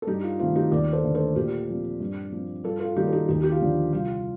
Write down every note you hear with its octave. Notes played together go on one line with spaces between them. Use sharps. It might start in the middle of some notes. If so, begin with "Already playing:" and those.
A4
G2 D#4 G4
F4
D#3 A3 C4 F4
D#4 G4
D#2 A#4 D5
A4 C5
D3 A3
A4 C5
A#2 G4 A#4
F3 C4
G2
F3 C4
G2 F4 A4
F4 A4
D#3 G3 A#3 D#4 G4
A4
D#4 G4
D#2 D#4 G4
G4
F4
D3 F3 D#4
C2 F4